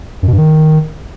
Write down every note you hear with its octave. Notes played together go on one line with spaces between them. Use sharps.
F#2
B2
G2
D#3